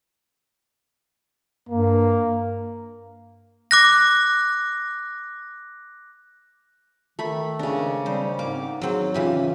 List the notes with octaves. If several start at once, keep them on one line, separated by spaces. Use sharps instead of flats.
G2 A#3
D6 F#6 A#6
D#3 A3 B5
G#2 C#3 D4
G3 C4 D#4 C5
G#2 A#3 D6
F#3 C4 G#4
C#3 E3 F4 G4